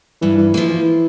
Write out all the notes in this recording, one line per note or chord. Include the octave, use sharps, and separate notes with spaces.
G2 E3
E3
E3 F3 A#3
E3